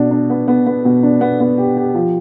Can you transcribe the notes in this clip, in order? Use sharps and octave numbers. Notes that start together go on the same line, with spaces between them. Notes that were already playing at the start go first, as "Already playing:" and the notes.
Already playing: B2 D4
D4
B3
B3
B3
B2
D4
B3
B3
G4
G4
F3